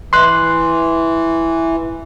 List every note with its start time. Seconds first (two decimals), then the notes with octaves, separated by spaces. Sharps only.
0.13 E3 C6 F#6